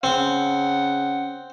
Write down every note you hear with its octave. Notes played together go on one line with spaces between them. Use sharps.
C#3 C4 F#5